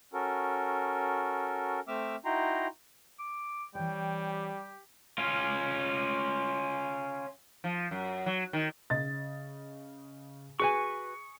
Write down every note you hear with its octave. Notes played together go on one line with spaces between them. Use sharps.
C#4 F#4 A4 A#4
A3 C4 E5 D6 E6 F6
D#4 E4 F#4 G5 A#5 C6
D6
E3 G3 C#5 G5
G4
C#4 F4
F3
F#2
F#3
D#3
C#3 D#5 A6
F#4 G#4 B4 G#5 C#6